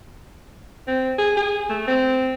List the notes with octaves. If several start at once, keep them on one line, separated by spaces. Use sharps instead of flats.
C4
G#4
G#4
A3
C4